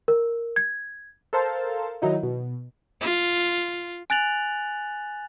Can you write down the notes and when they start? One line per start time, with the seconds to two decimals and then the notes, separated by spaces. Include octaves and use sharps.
0.08 A#4
0.56 G#6
1.33 A4 A#4 C5 F5 A5
2.02 D#3 F#3 D#4 E4
2.23 B2
3.01 F4
4.10 G#5 F#6 A6 F7 F#7